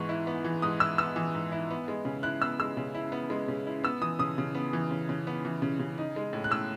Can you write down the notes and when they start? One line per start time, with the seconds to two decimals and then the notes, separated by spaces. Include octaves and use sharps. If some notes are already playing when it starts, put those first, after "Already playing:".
Already playing: G#2 E3 B3 C#6
0.09 E4
0.27 B3
0.44 E3
0.62 G#2 D#6
0.80 E4 E6
0.98 B3 E6
1.16 E3
1.35 G#2
1.52 E4
1.71 B3
1.88 G#3
2.05 C#3
2.23 E4 F#6
2.41 B3 E6
2.60 G#3 E6
2.77 C#3
2.95 E4
3.12 B3
3.30 G#3
3.48 C#3
3.67 E4
3.84 B3 E6
4.01 E3 D#6
4.19 C#3 D#6
4.38 C#3
4.55 B3
4.73 E3
4.91 C#3
5.09 C#3
5.27 B3
5.45 E3
5.62 C#3
5.79 C#3
5.98 D#4
6.16 G#3
6.33 A2
6.44 F#6
6.51 A2 E6